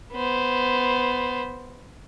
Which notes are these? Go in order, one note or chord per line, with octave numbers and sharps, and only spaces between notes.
B3 C5